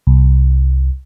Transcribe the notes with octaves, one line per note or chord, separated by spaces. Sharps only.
C2